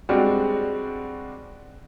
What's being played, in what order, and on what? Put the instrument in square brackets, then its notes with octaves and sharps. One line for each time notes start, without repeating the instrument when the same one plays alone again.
[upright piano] G3 G#3 C4 D4 F#4